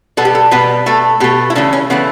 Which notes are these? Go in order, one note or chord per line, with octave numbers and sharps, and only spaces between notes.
B2 G3 B3 A4
G4
A4
B2 G3 B3 B4
B2 A3 A4
B2 A3 G4
E4
C#3 E3 A3 D4
C#4
C#3 E3 A3 B3